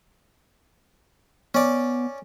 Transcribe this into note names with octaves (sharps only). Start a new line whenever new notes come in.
B3 C#4 D5